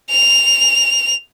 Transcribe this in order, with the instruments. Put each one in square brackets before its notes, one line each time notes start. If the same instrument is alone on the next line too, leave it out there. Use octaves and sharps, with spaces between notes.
[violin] F7